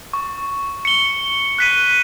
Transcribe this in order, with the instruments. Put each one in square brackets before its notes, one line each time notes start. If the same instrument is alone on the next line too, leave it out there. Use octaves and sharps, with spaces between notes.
[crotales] C#6
C#7 G7
F#6 B6 D#7